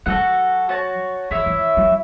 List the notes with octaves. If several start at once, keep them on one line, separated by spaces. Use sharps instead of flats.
F#3 F#4 A4 F#5
F#4 C#5 A5
E3 E4 C#5 E5
E3
F#3